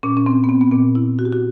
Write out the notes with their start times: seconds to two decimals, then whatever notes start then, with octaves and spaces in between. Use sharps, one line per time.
0.03 A#2 C#4
0.17 C#4
0.26 C4
0.44 B3
0.49 C4
0.61 B3
0.72 A#2 C4
0.95 E4
1.19 F#4
1.25 G4
1.33 F#4